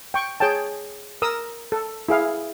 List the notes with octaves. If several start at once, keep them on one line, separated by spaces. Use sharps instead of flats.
G5 C#6
G#4 C#5 G5 A5
A#4 D#6 E6
A4
E4 G#4 F5